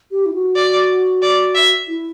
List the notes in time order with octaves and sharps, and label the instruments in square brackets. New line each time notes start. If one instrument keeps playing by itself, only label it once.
[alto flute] G4
E4
F#4
[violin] D5
D5
E5
[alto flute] E4